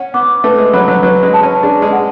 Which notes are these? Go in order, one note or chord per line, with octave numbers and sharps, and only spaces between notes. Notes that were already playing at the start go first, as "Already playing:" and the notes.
Already playing: C#4 F#5
B3 D6
A3 B4
G#3
F#3 B5
F#3
F#3 B4
G#3
A5
C#4
D4 G#4
G#3
F#5